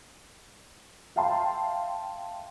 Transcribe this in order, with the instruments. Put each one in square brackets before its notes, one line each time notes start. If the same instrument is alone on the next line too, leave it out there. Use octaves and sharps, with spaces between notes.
[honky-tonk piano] E5 F5 G5 A5 C6